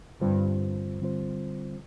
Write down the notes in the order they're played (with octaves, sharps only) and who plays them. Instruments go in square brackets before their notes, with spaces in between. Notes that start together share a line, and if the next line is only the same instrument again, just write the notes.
[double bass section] G2 [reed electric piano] D3 G3 C4 F4 C5
[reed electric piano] D3 G3 C4 F4 C5